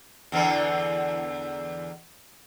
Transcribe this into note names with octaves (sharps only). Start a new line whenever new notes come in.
E2 D3 E3